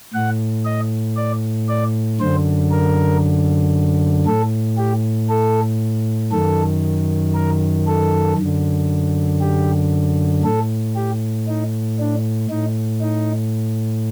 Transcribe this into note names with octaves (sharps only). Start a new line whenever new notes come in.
A2 F#5
D#5
D5
D5
F#2 D3 C5
A#4
A2 A4
G4
A4
F#2 D#3 A4
A#4
A4
F#2 D3
G4
A2 A4
G4
D#4
D4
A2 D#4
D#4